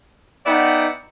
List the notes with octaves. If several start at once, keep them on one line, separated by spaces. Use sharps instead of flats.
B3 D#4 D5 E5 F#5 G5